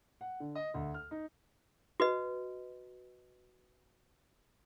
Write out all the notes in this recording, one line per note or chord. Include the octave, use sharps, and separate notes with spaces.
F#5
D3
D#5
D2
F6
D#4
F#4 B4 D#5